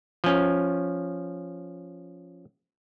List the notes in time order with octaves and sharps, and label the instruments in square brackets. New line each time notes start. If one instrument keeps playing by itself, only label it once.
[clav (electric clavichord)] F3 C#4